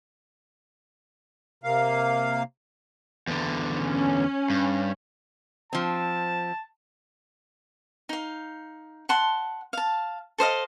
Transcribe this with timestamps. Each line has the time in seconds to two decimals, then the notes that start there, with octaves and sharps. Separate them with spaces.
1.64 C3 A#3 F5
3.27 E2 D3
3.78 C#4
4.50 G2
5.73 F3 C4 A5
8.09 D#4 F5
9.09 F#5 A5 C6
9.73 F5 A5
10.38 A4 C5 D#5 F5